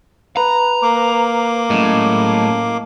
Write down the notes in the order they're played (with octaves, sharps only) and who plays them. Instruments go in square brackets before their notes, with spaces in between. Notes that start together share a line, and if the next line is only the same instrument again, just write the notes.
[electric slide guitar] B4 [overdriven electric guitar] A#5
[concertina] A#3 D6
[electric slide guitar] F#2 G#3 [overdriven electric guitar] A2